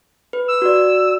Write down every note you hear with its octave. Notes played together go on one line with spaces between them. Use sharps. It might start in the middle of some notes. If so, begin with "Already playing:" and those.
B4
E6
F#4 D5